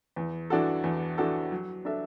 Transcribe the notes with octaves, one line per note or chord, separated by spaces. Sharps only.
E2
E3 D4 F#4 A4
E2
E3 D4 F#4 A4
F#3
D4 A4 E5